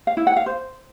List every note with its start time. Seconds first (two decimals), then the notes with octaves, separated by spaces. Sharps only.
0.07 F5
0.17 E4
0.27 F#5
0.36 F5
0.46 C5